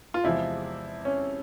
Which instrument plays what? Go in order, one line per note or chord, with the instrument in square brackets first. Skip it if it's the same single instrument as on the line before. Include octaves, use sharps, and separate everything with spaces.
[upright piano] F4
[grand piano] E2 C3 F3 G#3 C4 [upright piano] E4
[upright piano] C#4